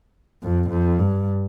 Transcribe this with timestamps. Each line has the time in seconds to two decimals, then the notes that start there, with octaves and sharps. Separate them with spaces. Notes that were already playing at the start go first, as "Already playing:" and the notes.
0.43 F2
0.71 F2
0.99 G2